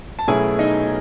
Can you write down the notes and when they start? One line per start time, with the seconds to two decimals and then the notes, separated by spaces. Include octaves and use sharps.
0.19 A5
0.28 B1 B2 A3 C#4 E4 G#4 G#5
0.59 D#4 D#5